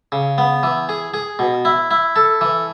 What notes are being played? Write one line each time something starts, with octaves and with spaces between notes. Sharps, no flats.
C#3
B3
E3
G#4
G#4
B2
E4
E4
A4
E3